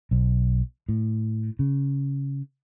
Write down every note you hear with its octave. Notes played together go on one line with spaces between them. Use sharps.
B1
A2
C#3